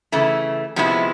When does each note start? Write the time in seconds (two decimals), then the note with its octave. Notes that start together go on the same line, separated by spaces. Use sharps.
0.12 C#3 E3 A3
0.76 C3 F3 G#3 B3 E4